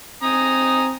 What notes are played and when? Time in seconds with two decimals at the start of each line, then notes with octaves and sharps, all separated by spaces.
0.23 C4 G#5 A#5 D#6